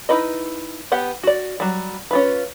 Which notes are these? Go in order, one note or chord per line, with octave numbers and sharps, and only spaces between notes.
D#4 E4 B4 D#5
B3 G4 F#5
F#4 D5
F#3 G3
C#4 F4 B4